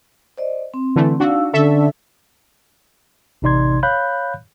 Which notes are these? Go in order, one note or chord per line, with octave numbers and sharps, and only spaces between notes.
C5 D5 D#5
C4
D3 E3 A3
D4 D#4 F#4 F5 E6
D3 C#4 A4 E5
A1 C3 D#4 D5 C6 G#6
C#5 F5 B5 F#6 G6